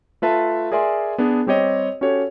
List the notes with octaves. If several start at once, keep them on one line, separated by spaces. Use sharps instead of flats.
A3 F4 B4 E5 A5
G#4 A#4 D5 E5 G#5 C6
B3 D4 G#4
G3 C4 G4 C#5 D#5
C#4 F#4 G4 A4 C#5